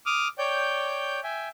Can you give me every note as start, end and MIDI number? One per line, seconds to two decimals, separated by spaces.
0.06 0.28 86
0.06 0.28 87
0.06 0.28 89
0.38 1.20 73
0.38 1.20 74
0.38 1.20 79
0.38 1.20 91
1.24 1.49 76
1.24 1.49 79
1.24 1.49 80